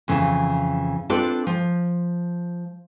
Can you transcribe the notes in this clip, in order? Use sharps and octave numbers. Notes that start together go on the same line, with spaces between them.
F2 C#3 E3
C4 D4 F4 A4 B4 D5
F3